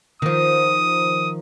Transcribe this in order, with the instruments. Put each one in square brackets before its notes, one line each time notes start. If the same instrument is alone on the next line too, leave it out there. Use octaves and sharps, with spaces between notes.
[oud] D#3 F3 [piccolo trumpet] D#6